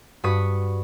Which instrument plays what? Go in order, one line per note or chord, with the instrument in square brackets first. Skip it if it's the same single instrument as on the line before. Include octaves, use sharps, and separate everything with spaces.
[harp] G2 F#4 B4 C#6 D#6 B6